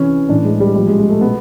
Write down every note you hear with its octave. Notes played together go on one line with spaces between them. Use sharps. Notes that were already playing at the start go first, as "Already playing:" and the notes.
Already playing: C3 E3 C#4
A2 E3 D4
G#3
G3
A#2 F3 G3
G#3
G#3
A3
B2 B3